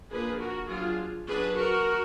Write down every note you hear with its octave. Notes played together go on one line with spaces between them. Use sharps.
F3 A#3 D4 G#4 B4
F#4 A#4
F#3 D4 F4 G#4
F#3 D4 G#4 B4
F#4 A#4